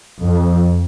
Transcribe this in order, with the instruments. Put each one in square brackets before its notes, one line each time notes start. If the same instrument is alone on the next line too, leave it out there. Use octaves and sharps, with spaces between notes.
[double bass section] F2